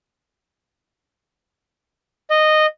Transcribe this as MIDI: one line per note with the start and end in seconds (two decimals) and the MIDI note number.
2.30 2.66 75